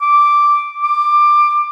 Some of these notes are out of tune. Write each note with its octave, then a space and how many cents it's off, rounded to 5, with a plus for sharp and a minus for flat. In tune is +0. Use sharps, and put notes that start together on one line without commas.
D6 +0
D6 +15